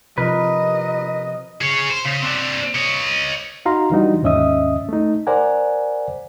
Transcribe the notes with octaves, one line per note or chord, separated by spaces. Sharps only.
C3 F3 A#4 B4 D#5
G#4 C#5
C5
C#3
C4 D4
C#5 D#5
D#4 F#4 F5 A#5 C6
E3 G3 D4 D#4 F#4
D#2 G#2 C#4 D#5 E5 D#6
A3 D#4
A#4 C5 D5 F#5 G#5